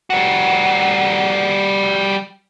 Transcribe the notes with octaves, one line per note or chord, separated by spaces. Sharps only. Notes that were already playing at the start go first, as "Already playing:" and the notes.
G3 F#4